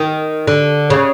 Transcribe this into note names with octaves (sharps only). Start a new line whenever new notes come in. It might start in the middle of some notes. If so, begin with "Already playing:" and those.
Already playing: D#3
D3
C#3